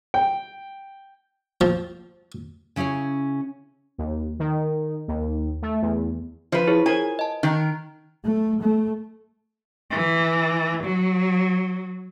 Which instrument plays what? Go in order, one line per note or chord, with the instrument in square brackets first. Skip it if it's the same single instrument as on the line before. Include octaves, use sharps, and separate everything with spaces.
[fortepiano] G5
[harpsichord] F3
[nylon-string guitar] C#3 C#4 E4 G#4 C#5
[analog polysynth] D#2
D#3
D#2
A3
E2
[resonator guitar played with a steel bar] F3 B4 [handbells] C5
[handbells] E4 G#4 C#5
[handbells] F4 A#4 C5 [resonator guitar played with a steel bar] G#5
[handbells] D#5 A5
[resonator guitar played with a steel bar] D#3 A#4 [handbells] F#6
[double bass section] A3
A3
[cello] E3
F#3